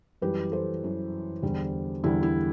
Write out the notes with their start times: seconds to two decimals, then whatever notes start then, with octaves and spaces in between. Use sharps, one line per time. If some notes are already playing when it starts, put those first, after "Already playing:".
0.22 F#2 E3 G3 G4 B4
0.52 A4 C5
0.83 F#2 E3 G3
1.42 E2 D3 G3
2.04 E2 D3 G3 E4
2.23 E4